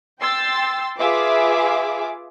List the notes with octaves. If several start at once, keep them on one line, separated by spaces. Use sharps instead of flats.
G5 C6 E6 A6
F4 G#4 B4 E5 F5 D6